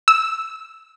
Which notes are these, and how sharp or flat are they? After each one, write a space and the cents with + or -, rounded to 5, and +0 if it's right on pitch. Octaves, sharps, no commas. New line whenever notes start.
E6 -5